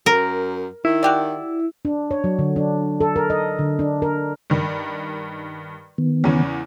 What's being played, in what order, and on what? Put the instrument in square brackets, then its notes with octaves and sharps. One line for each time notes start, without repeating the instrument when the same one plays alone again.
[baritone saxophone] F#2 [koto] A#4
[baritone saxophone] D#3 [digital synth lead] E4
[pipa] F#4 G4 D5
[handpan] D4
C#5
F#3
D3
D4
A4
A#4
D#5
D3
D4
A#4
[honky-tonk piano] G2 D#3
[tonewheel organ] D#3 B3
[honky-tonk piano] E2 C#3 C#4